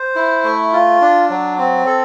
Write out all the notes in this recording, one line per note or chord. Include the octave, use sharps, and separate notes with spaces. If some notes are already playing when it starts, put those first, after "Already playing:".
Already playing: C5
E4
A3
F4
D4
F#3
C4
A4